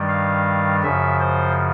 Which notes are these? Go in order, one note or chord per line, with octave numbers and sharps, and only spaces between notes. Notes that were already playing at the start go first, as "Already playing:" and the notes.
Already playing: G2 D#3 G3
F5
F#2 C#3 F3 E5
C5